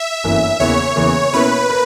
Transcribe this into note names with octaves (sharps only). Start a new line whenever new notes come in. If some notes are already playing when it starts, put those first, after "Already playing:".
Already playing: E5
G1 F#2 E3 A#3 E4
E2 C#3 E3 A#3 C#5
E2 C#3 E3 A#3
B2 A#3 C#4 E4 A#4 B4
A#4